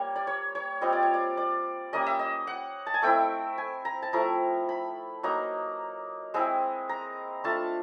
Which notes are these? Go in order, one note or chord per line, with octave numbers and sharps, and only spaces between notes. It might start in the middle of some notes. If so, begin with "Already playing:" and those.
Already playing: G3 A#3 C#5
D5
C#5
C#5
G3 C4 F4 D#5
D5
C#5
D5
D5
G3 A#3 C#4 D#5
E5
D#5
F#5
A5
G#5
A3 C4 E4 G5
G#5
A#5
A5
F3 A3 C4 E4 A#5
B5
F#3 A#3 D#4 A#5
G#3 C4 E4
A#5
A3 D4 F4 A5